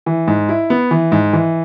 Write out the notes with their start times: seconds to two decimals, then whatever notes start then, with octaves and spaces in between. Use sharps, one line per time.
0.06 E3
0.28 G#2
0.49 E4
0.70 B3
0.91 E3
1.12 G#2
1.33 E3